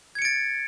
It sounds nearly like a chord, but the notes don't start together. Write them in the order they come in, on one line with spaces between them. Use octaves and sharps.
G#6 C#7 D7 A6